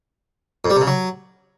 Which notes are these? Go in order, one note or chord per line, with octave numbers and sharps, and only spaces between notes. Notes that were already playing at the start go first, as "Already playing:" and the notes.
F2
G3
C3
C#3
F#3